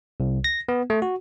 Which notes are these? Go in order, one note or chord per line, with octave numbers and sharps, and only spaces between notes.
C2
A#6
B3
A3
F#4